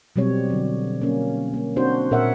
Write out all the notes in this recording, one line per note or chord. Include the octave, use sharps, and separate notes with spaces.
B2 F#3 G3 C4 C#5
D3 F#3
A#3 C#4
A#3
C4 D4 F#4 C5
A#2 A#4 C#5 E5 F#5